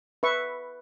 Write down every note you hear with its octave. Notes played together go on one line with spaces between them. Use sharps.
B4 E5 C#6